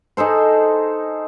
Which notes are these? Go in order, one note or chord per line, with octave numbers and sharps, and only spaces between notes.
D#4 G#4 A4 C5